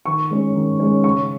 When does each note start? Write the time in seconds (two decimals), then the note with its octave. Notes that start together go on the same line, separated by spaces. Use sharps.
0.06 D#3 C#6
0.31 G#3 C#4
0.55 D#3
0.80 G#3 C#4
1.04 C#3 C#6